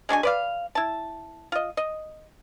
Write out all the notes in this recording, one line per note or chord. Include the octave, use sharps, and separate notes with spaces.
G#3 D4 F#4 G#5
B4 D5 F5
E4 A5
F4 D#5
D#5